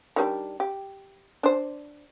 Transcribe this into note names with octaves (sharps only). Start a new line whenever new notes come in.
D#3 G3 D4
G4
D4 C5